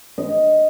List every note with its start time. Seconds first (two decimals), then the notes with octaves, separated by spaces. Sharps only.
0.18 D#5